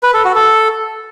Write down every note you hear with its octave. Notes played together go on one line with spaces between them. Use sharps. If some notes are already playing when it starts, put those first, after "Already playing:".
B4
A4
F#4
A4